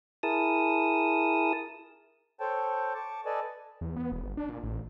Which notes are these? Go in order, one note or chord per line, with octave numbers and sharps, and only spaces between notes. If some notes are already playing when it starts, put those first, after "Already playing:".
E4 G#4 A#4 A5 D#6
A4 C5 C#5 G5 A5
A5 C#6 D6
A4 B4 D5 D#5 G#5 A5
E2
B3
D#1
G1
D4
A#2
A1